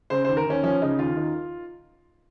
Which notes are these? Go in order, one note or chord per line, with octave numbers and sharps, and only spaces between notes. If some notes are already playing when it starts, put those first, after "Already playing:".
C#3 C5
D#2 C5
A#4
D#2 C#4
F3 C#4
C#3 D#4
D#2 F4
D#3